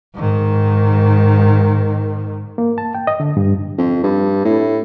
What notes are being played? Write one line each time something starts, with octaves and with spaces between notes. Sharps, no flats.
G#2 D#3
A#3
A5
G5
D#5
D3
G2
F2
G2
A2